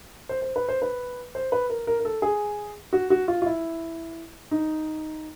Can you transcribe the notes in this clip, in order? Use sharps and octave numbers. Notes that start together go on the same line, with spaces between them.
C5
C5
B4
C5
B4
C5
B4
A#4
A#4
A#4
A4
G#4
F#4
F#4
F4
F4
E4
D#4